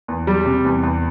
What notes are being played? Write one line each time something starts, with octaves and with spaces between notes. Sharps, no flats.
E2
G3
C3
E2
E2